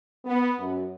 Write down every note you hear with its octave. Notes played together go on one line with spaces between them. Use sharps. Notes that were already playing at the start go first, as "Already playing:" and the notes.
B3
F#2